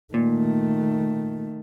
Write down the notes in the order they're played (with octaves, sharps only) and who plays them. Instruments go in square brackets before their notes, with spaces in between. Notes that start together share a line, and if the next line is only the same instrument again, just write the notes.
[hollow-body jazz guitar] A#2 [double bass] D#3 A3